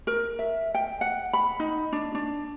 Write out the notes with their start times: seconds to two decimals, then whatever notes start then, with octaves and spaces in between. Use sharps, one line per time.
0.07 A#4
0.39 E5
0.75 G5
1.01 F#5
1.33 B5
1.60 D#4
1.92 D4
2.15 D4